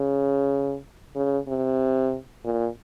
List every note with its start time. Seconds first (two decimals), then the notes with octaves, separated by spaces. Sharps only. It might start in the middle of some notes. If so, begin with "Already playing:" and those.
Already playing: C#3
1.15 C#3
1.48 C3
2.44 A#2